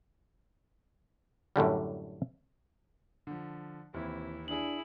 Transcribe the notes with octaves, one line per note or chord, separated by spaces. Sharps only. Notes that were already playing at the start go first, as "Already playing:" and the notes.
F#2 A2 D3 G3
D3 F3
D#2 C3 E3 E4
D4 E4 G#4 F#7